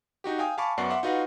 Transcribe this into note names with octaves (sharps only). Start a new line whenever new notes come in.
D#4 F#4 G4
F5 G5 G#5 D#6
F5 G#5 A5 B5 C#6 D6
F#2 B3 D5 F#5 C#6 C7
E5 F#5 C6 D6
D#4 F4 F#4 B4 F5 F#5